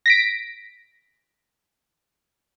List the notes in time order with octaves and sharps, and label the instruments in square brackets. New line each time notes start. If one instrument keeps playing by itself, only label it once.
[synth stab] A#6 B6 D7